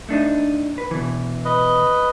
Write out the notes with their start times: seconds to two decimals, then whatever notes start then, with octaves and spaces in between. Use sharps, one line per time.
0.09 A3 D4 D#4
0.78 B4
0.91 B2 E3
1.45 B4 D#5